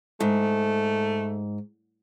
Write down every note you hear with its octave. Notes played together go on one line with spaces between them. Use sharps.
G#2 A3